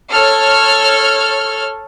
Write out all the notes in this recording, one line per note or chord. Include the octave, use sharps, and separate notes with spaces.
A4 C#5 F6